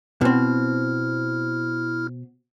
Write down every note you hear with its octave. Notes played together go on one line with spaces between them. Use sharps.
B2 C4 E4 F6